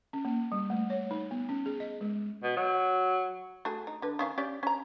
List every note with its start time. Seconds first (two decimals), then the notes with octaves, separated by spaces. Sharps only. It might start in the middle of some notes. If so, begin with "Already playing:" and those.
0.13 C#4
0.25 A#3
0.52 G3
0.70 A3
0.90 C#5
1.11 D#4
1.31 B3
1.49 C#4
1.66 G#4
1.80 D#5
2.01 G#3
2.43 B2
2.57 F#3
3.65 A3 F#4 G#4
3.87 D#4
4.02 D3 B4
4.19 D#3 C#4 F5
4.38 C#4 G4 D5
4.63 C#4 A#5